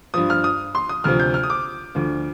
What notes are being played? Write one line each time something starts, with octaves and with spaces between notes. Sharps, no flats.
G2 F3 D#6
F6
D#6
C6
D#6
D2 C3 F3 F6
G6
F6
D#6
D6
D2 D3 F3